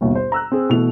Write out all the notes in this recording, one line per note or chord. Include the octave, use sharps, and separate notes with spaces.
G1 D#2 B2
C5
A#5 E6 F#6
C4 G#4
B2 E3 A3 F7